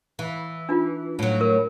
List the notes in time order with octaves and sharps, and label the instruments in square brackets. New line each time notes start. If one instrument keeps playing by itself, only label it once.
[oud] E3
[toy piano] D4 D#4 F4
[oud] A2 F#3
[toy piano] A#4